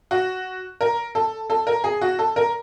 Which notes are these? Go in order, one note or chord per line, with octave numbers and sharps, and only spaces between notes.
F#4
A#4
A4
A4
A#4
G#4
F#4
A4
A#4